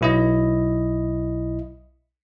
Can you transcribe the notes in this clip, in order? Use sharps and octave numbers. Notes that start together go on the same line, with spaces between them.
B1 E4 D#5